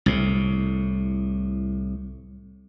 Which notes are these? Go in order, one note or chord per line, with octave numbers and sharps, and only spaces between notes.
C2 A2